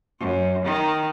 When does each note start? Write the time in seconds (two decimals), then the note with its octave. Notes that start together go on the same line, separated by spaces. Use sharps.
0.20 F#2
0.65 D#3